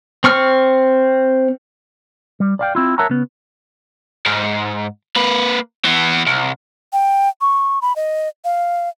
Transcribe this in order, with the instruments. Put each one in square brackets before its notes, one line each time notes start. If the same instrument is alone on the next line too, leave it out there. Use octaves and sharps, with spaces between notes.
[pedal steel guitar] C4 C#6 F6
[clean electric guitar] G3
D5 F5 G5
C4 E4 F4
A#4 C#5 E5 F#5 A5 A#5
C#3 B3
[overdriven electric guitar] G#2
A#3 B4
E3 B3
C2
[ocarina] G5
C#6
B5
D#5
F5